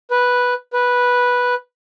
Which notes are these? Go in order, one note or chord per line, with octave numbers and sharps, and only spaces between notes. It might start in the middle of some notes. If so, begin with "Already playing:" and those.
B4
B4